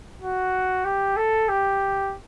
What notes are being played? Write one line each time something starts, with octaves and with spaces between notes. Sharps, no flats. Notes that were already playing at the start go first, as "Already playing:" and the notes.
F#4
G4
A4
G4